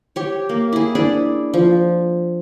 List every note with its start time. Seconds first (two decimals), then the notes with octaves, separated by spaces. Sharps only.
0.16 G4 C#5
0.49 A#3
0.73 E4 G#4
0.95 D4 E4 G#4 D5
1.54 F3